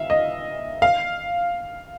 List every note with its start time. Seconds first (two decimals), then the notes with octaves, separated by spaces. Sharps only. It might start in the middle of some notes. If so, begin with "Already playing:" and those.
Already playing: E5 F5
0.10 D#5
0.82 F5